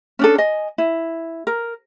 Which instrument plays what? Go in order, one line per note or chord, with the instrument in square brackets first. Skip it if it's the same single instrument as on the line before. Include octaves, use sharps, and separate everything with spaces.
[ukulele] C#4 D4 A4
D#5 G#5
E4
A#4